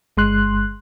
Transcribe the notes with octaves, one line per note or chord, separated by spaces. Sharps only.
G1 G#3 C6 F#6